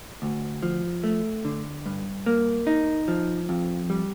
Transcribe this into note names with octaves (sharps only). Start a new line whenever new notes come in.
D2
F3
A3
D3
G2
A#3
D#4
F3
F2
G3